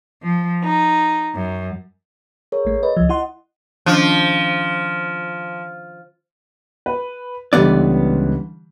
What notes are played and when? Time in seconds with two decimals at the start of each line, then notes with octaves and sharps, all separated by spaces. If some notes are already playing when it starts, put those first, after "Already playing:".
0.21 F3
0.64 D#4
1.34 F#2
2.52 G#4 A#4 C#5
2.65 A1 A3
2.83 B4 D#5
2.97 C#2 F3
3.09 E4 F#5 C6
3.86 D#3 F3 C#4 D4
6.86 B4
7.53 C#2 D3 E3 G3 B3 D5